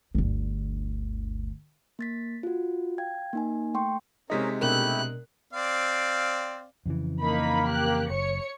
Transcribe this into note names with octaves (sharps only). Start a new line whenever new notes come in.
G1 D2
A#3 A6 B6
F4 F#4
F5 G5 G#6
A#3 D#4 G#5
A3 G5 C6 C#6
C3 G#3 C#4 D#4 A#4 D#5 B6
B2 A3 D4 E4 G4 A#4 F#6
C4 D5 F5
F2 C#3 E3
A#3 D#4 B5
G4 F#6
F#1 C#5 C#7